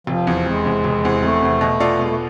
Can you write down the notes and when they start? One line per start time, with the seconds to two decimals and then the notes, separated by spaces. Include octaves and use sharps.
0.07 F1 F3
0.27 E2 C3
0.45 F1 G#3
0.65 E2 C3
0.84 F1
1.04 E2 C3
1.22 F1 A3
1.42 E2 C3
1.61 B2
1.80 B3 F4 A4 D5
1.99 B2 G#3
2.07 A3